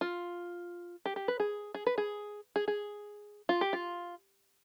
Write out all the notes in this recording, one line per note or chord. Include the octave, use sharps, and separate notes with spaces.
F4
G4
G4
B4
G#4
G#4
B4
G#4
G#4
G#4
F4
G4
F4